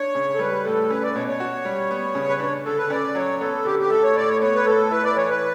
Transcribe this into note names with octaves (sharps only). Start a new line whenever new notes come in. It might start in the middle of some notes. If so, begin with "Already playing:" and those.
Already playing: D4 C#5
C#3
A4
G3 B4
A2 A4
C#4 B4
D5
B2 C#5
C#5
F#4
G3
B3
C#3
B4
D4 C#5
D3 A4
B4
C#4 D5
F#3 C#5
B3 A4
D3 G4
G4
A3 A4
C#5
A2 D5
C#5
B3 C#5
B4
A2 A4
E4 B4
D5
E3 C#5
B4